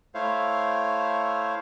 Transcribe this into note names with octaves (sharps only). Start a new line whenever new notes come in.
A3 E4 C5 C#5 F5